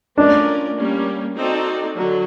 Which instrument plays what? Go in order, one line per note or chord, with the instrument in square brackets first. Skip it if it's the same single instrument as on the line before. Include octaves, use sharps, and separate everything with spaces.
[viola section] A3 C#4 F4 A#4 D5 [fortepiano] D4
[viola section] G3 A#3 C#4
C4 D#4 F#4 A4 D5
D3 F#3